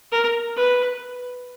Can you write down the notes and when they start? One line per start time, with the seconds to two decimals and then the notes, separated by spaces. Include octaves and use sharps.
0.12 A#4
0.56 B4